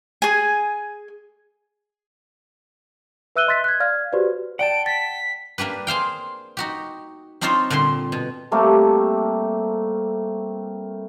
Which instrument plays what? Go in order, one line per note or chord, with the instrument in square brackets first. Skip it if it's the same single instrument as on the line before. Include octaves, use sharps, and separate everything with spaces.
[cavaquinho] G#4 G#5
[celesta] B4 E5 E6 F#6 D#7 G7
D#5 E5 C6 F#6 A6 B6
F#6 G#6
D5 F5 F6 G#6
F#4 G4 B4 C5 D5
[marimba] D5 [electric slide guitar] F#5 G5 A5 [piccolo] D7
[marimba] A6 [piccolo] B6
[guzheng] A#3 D4 G4 B4
G#4 C5 F5 G5
D#4 F#4 G4
C4 D4 D#4 F4 C5 C#5
A#2 D3 G3 C5 C6
B2
[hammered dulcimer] G3 A3 A#3 C4